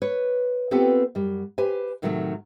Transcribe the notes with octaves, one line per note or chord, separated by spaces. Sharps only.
B4 C#5
B3 C4 F4 G4 A4 B4
F#2 G3
G4 B4 C5 G#5
A2 C3 D#3 F#3 G#3 A3